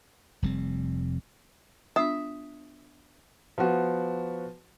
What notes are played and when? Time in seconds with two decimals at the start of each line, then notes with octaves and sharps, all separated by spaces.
0.42 F1 G3 C4
1.96 B3 D4 F4 E5 D#6
3.58 F3 B3 F#4